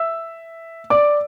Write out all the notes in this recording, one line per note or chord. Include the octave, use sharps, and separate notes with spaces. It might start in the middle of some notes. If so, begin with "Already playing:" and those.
Already playing: E5 E6
D5 D6